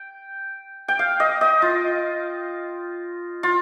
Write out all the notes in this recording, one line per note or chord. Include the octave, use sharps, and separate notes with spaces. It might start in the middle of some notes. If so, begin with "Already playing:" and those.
Already playing: G5
G5
F5
D#5
D#5
F4
F4